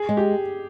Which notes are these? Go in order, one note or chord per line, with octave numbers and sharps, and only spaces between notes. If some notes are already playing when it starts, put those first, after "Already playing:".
Already playing: G#4
G#3
G4